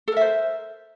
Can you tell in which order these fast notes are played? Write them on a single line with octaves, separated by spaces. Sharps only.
A4 A#4 E5 C5